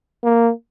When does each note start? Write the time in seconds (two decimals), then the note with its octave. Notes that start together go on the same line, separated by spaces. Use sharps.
0.24 A#3